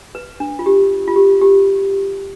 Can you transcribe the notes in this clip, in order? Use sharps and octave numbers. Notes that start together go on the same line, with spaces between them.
B4
D4
F4
G4
F4
G4
G4